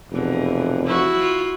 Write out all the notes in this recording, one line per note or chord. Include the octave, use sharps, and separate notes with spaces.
F1 E2 B2
F3 E4 F#4
F4